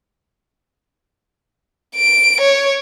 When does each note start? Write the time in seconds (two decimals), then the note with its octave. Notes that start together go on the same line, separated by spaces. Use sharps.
1.96 D7
2.41 C#5